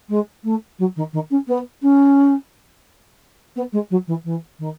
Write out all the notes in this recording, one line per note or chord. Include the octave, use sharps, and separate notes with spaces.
G#3
A3
F#3
D#3
D#3
C#4
B3
C#4
B3
G#3
F#3
E3
E3
D#3